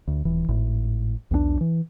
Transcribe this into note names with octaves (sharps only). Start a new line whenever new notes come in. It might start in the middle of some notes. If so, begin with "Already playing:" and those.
D2
D#1 E3
G#1 A2
B1 E2 F3 D4
E3